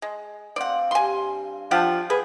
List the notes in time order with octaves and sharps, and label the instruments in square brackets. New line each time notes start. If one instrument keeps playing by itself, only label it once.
[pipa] G#3
[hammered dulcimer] C4 F5 [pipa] D5 F#5
[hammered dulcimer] G2 [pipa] G#5 C6
[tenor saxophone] F3 [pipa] D4 G4 F#5
[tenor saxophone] G#4 [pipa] B4